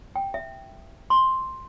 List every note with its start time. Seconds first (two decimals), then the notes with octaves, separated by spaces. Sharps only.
0.16 G5
0.34 E5
1.10 C6